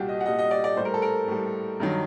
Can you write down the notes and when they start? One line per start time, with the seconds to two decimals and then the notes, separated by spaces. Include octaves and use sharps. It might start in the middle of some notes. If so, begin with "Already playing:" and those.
Already playing: C2 A#2 G3 F#4 G4
0.09 D#5
0.21 F#5
0.26 C2 A#2 G3 D#5
0.39 D#5
0.51 D5
0.64 D5
0.76 A2 G3 C5
0.85 A#4
0.94 A4
1.02 A#4
1.28 A2 G3
1.80 G2 D#3 F#3